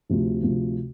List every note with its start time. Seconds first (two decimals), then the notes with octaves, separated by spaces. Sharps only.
0.09 D2 C3 F3
0.43 D2 C3 F3